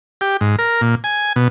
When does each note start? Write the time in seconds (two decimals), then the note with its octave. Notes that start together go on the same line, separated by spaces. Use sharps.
0.21 G4
0.41 G#2
0.59 A#4
0.81 A#2
1.04 G#5
1.36 B2